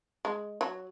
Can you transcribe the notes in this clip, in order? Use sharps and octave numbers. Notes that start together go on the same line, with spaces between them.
G#3
F#3